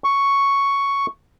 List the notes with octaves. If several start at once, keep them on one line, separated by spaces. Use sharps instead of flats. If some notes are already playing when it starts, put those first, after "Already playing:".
C#6